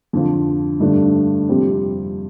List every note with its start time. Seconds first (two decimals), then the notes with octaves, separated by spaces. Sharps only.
0.13 F2 D3 F3
0.80 G2 D3 A3 D4
1.49 F2 C3 G3 C4 G4